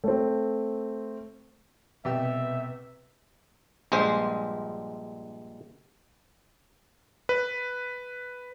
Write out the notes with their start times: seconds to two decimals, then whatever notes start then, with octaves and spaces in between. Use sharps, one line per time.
0.04 A3 C4
2.05 C2 B2 G4 B4 E5 E6
3.92 A#1 G2 G#3 C5
7.29 B4